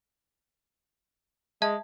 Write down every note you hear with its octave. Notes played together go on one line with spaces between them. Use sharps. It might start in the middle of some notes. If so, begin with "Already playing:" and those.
G#3 E5 A5 G#6